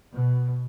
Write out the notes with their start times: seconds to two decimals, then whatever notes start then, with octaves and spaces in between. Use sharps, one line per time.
0.13 B2